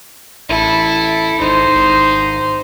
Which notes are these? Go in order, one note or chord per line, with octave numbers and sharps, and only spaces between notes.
A1 E4 A4
G#1 D#4 C5
G#1